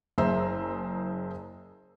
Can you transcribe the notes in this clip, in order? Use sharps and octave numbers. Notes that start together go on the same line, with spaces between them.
F#1 G#4 C5 E5 A#5 E6